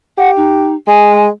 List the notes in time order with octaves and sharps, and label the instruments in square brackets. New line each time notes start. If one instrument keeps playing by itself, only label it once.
[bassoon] G4 [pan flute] F#5
[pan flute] D#4
[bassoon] G#3 [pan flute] G#5